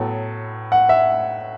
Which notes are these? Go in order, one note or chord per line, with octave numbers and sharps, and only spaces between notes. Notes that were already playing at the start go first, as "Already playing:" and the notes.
Already playing: A2 F#3 B3 A4
F#5
E5